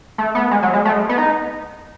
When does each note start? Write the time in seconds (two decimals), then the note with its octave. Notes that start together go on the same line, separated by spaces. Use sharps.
0.18 A3
0.35 B3
0.51 G#3
0.63 F#3
0.73 G#3
0.85 A3
0.93 G#3
1.09 B3
1.18 D#4